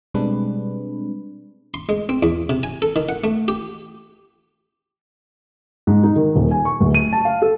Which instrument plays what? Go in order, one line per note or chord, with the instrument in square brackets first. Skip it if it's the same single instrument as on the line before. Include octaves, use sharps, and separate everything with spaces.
[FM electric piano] B2 G3 G#3 C4 D4 B4
[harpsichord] C6
G#3
C4
E2
C3
G#5
A4
D#3
F#5
A3
G4
[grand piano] G#2
D#4
D#3
D#1
G#5
C#6
D1
D#7
A5
F5
A4